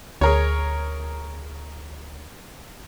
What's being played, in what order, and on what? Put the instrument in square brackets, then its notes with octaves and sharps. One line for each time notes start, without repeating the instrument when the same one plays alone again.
[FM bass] D2 [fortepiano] G#4 A#4 C#5